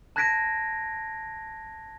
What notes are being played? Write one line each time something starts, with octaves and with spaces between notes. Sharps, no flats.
A5 F#6 G#6 A#6 B6 D7